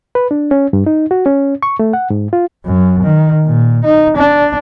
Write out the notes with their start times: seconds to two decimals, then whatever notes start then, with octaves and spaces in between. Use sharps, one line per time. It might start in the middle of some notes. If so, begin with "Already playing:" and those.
0.15 B4
0.31 D4
0.51 C#4
0.73 G2
0.86 D#4
1.11 F#4
1.26 C#4
1.63 C#6
1.79 A3
1.93 F#5
2.10 G#2
2.33 F4
2.65 F#2
3.03 D#3
3.46 A#2
3.85 D#4
4.17 D4